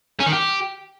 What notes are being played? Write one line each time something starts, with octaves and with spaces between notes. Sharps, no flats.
C#4
D#3
G4